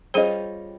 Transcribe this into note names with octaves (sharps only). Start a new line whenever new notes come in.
G3 C#4 F4 G#4 A#4 C5 D#5